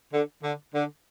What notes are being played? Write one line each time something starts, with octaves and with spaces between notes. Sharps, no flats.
D3
D3
D3